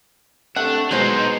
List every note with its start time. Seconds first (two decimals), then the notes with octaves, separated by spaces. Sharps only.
0.56 C3 A3 D4 F#5
0.91 B2 F#3 G#3 D#4 C5 C#5